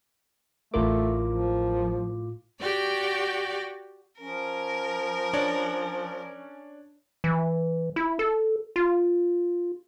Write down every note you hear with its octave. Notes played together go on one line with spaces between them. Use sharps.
A1 A2 A3 F4 A#4 D6
F3
F#4 G4 D5 G5
F3 C#4 A#4
D4 C#5 D5
E3
E4
A4
F4